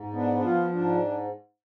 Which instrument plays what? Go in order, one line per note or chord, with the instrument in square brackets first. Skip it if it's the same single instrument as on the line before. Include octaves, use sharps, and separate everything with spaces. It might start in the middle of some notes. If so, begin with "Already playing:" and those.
Already playing: [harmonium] G#2
B3 D4
D4
F3 F4
G#2 D4